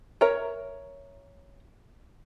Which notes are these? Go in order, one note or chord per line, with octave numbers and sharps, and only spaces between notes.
A#4 C#5 E5 A#5